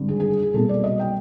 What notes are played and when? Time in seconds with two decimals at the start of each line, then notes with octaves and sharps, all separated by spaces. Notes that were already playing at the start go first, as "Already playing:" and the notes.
Already playing: G#1 G2 D3
0.08 G#4
0.20 G#4
0.42 G#4
0.53 C2 B2 F#3 A#3 A4
0.69 D5
0.84 D#5
1.00 G5